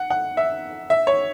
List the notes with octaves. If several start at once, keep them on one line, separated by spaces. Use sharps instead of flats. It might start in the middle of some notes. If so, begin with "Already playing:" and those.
Already playing: F#5
F#5
E5
E5
C#5